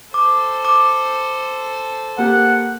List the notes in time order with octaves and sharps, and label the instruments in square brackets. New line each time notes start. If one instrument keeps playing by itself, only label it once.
[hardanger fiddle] A4 C5 [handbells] D6
[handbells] D6
[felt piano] A#3 G4 [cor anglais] F#5